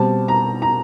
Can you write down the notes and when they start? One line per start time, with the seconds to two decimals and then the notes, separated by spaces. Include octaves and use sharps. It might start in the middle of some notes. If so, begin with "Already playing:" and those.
Already playing: B2 G3 C4 A5
0.28 A#5
0.62 A#5